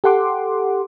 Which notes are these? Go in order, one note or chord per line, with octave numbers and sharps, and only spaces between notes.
G4 A4 F#5 C6 D6